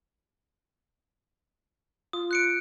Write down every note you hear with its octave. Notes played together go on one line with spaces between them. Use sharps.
F4 D#6
F#6 C#7 D7